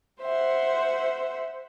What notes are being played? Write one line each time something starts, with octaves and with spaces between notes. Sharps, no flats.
C5 E5 F#5